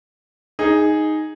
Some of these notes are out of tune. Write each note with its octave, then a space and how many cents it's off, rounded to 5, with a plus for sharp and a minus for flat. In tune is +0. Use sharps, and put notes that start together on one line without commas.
D#4 +0 G#4 +0